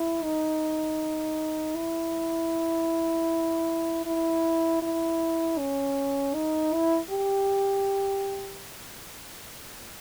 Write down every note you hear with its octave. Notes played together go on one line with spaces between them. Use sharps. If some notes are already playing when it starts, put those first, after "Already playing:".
Already playing: E4
D#4
E4
E4
E4
C#4
D#4
E4
G4